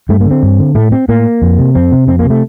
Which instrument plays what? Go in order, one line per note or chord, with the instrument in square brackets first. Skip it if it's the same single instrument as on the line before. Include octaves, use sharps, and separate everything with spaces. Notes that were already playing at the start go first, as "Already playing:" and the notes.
[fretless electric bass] G2 A3
A#3
D3
C4
G2
D3
A2 A3
C4
A2 A#3
F2
C3
F2 C4
C3
F2 C4
A#3
C3
A3